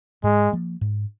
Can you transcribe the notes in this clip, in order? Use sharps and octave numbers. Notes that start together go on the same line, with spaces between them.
G#2 G#3
F3 A#3
G#2